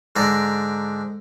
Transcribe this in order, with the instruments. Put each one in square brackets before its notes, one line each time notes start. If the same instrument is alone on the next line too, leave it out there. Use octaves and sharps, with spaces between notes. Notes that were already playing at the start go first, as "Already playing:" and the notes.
[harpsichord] G#2 D3 D5 A#5